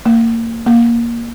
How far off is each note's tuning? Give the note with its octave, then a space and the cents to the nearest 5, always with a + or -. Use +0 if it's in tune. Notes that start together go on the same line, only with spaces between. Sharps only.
A#3 -25
A#3 +10